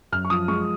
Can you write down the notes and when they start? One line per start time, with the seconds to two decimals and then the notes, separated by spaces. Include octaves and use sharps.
0.12 F#2 F6
0.25 C#6
0.30 F3 D#6
0.48 G#3 C#6